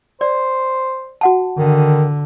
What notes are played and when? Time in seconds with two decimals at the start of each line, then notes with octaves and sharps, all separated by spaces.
0.21 C5 D5
1.21 F#4 F#5 A5
1.58 D3 D#3